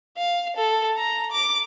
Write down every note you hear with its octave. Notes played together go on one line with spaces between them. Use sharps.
F5
A4
A#5
D6